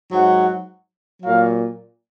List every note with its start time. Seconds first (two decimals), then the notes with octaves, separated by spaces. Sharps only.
0.11 G#2 F#3 F#5
1.23 A#2 F#3 F5